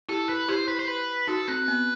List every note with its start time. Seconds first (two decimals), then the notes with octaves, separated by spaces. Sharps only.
0.09 E4 G4 A4
0.29 B4
0.48 E4 G4 C5
0.68 B4
0.79 C5
0.88 B4
1.27 D#4 F#4 A4
1.48 C4 B4
1.68 B3